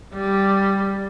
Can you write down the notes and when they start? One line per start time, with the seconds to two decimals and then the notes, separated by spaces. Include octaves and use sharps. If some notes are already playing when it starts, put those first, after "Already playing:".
0.15 G3